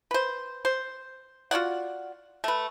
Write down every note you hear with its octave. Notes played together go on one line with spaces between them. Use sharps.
B4 C5
C5
F4 F#4 D5 F#5
A3 B4